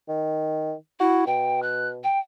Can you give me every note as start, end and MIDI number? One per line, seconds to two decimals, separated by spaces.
0.09 0.73 51
1.00 1.25 64
1.00 1.25 66
1.27 2.05 47
1.27 1.60 79
1.63 1.88 90
2.04 2.19 79